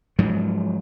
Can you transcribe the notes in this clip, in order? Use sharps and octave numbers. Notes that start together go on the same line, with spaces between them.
G#2 F3 F#3